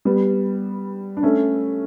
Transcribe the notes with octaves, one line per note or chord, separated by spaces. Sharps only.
G3 B3
D4
A3 C#4